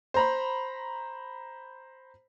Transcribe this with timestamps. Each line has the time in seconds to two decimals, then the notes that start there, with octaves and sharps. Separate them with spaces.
0.14 C5 A#5 B5